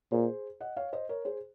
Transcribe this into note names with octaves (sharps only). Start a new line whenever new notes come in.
A#2 G#4 C5
D#5 F#5
C#5 F5
C5 D#5
A#4 C#5
G#4 C5